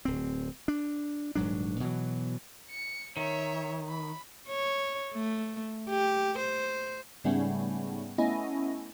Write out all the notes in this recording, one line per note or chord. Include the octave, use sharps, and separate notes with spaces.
D1 C4
D4
D#1 G#2 F#3 D4
B2 E3 F#3
C#7
D#3 C#5 E5
B5
C#5
A3
G4
C5
G#2 C#3 G3 A3 B3 C#4
A3 B3 C#4 E4 D#5